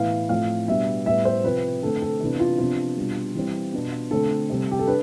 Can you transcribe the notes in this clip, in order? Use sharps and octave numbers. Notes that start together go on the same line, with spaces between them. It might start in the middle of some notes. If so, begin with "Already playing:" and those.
Already playing: A2 E3 B3 F5
A2 F3 A3 C4 F5
B2 G3 B3 D4 E5
A2 G3 B3 E5
C5
C3 F3 C4 B4
D3 A3 C4 A4
A4
C3 E3 B3 D4
F4
C3 F3 B3 D4 F4
B2 G3 D4
E3 G3 C4
B2 B3 D4
D3 A3 C4 A4
C3 G3 C4
G4
A4
D4 B4